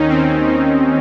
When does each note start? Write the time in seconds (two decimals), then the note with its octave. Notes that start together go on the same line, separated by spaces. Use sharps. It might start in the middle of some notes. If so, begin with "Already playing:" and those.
Already playing: D#2 D#3 C#4 D#4
0.10 C4
0.47 D#4